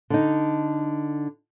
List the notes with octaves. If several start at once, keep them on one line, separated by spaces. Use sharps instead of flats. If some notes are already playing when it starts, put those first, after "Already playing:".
D3 D#4